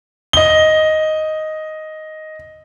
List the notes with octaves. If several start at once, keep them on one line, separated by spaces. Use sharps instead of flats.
D#5 G7